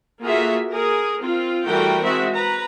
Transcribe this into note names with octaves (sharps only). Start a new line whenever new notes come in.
A#3 F4 F#4 G#4 A4 E5
G#4 A#4
C4 F4
E3 G3 A3 F#4 A#4 G5
G#3 C4 F#4 E5
B4 A#5